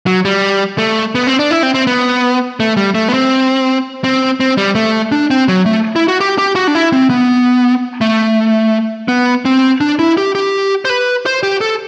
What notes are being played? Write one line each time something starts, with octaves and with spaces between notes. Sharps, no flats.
F#3
G3
A3
B3
C4
D4
E4
C4
C4
B3
A3
G3
A3
B3
C4
C4
C4
G3
A3
D4
C4
F#3
A3
E4
F#4
G4
G4
F#4
D4
E4
C4
B3
A3
B3
C4
D4
E4
G4
G4
C5
B4
C5
G4
A4